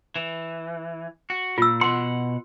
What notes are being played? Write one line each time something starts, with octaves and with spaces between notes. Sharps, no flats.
E3
F#4
A#2 F4 E6
B2 F#5 C6